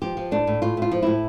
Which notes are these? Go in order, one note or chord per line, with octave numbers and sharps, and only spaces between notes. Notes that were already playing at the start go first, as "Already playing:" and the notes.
F3 G4
F3
A2 D4
A2
A2 F4
A2 F4
F3
A2 E4